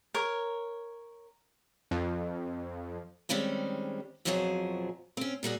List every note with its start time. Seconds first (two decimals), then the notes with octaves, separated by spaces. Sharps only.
0.14 A#4 C#5
1.91 F2
3.29 D#3 G3 G#3 C4 C#4
4.25 F2 B2 F3 F#3 G4 G#4
5.17 C4 C#4
5.43 A#2 G3 F#4 G#4